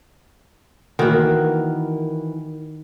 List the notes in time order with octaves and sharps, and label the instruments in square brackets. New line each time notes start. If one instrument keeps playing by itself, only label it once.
[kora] D#3 F#4 [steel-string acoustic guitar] E3 A#3